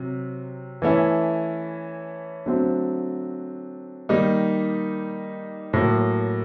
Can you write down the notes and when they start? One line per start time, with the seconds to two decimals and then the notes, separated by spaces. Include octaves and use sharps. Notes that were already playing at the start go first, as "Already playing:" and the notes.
Already playing: C3 F#3
0.82 E3 A3 C#4 E4
2.46 D3 F#3 A3 C4
4.09 D#3 G3 A#3 D#4
5.73 A2 F#3 A#3